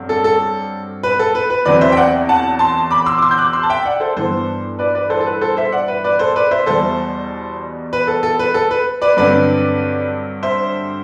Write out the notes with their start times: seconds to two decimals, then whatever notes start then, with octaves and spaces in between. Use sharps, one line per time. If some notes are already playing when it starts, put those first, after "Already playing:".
Already playing: G2 F#3 A3 C4
0.09 A4
0.24 A4
1.03 B4
1.19 A4
1.35 B4
1.50 B4
1.65 E2 B2 F#3 C4 B4 D5
1.81 C5 E5
1.92 G5
1.96 D5 F#5
2.29 F#5 A5
2.59 A5 C6
2.91 B5 D6
3.06 C6 E6
3.18 D6
3.22 C6 E6
3.31 G6
3.38 D6 F#6
3.53 C6 E6
3.63 A5
3.70 E5 G5
3.85 D5 F#5
4.00 A4 C5
4.16 G2 E3 B3 A4 C5
4.79 B4 D5
4.95 B4 D5
5.10 A4 C5
5.20 A4
5.26 B4
5.41 A4 C5
5.57 C5 E5
5.72 D5 F#5
5.88 B4
6.04 B4 D5
6.19 A4 C5
6.36 B4 D5
6.51 C5 E5
6.66 E2 B2 G3 A4 C5
7.93 B4
8.07 A4
8.23 A4
8.39 B4
8.54 A4
8.71 B4
9.02 B4 D5
9.17 G2 D3 F#3 C4 B4 D5
10.43 C5 E5